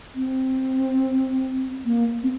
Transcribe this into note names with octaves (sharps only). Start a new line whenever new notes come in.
C4
A#3
C4